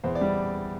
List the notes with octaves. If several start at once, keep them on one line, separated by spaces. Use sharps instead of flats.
E2 C5
D5
G3